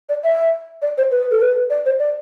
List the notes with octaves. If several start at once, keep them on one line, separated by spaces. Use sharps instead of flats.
D5
E5
D5
C5
B4
A4
B4
D5
C5
D5